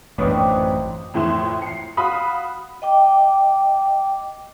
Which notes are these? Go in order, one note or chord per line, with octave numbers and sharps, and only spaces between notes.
A1 F#2 C4 D4 B4 C#5 D#5 D6
F2 A2 E3 C6 E7
C7 C#7
F#4 F5 B5 D#6
D#5 G5 D6